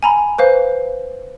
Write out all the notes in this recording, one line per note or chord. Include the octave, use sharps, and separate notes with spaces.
G#5 A#5 B5
B4 C5 F5